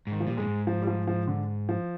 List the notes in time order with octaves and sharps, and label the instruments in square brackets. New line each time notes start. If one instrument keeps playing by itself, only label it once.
[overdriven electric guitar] G#2 [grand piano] D#3
[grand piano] F3
[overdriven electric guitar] A#2 [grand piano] G3
[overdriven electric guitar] G2 [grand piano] G#3
[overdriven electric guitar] G#2
[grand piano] F3
G3
F3
F3
D3
F3